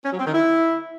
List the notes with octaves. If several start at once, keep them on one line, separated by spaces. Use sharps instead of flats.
C#4
F#3
C4
D#3
E4